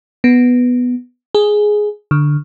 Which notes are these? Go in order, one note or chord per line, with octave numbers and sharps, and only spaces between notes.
B3
G#4
D3